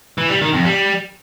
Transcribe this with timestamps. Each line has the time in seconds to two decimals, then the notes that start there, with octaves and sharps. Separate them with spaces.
0.18 E3
0.30 G3
0.41 D#3
0.53 F2
0.65 G3